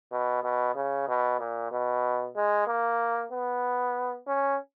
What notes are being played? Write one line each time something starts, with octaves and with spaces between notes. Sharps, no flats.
B2
B2
C#3
B2
A#2
B2
G#3
A#3
B3
C#4